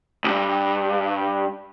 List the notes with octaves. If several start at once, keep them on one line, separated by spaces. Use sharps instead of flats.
C#2 G2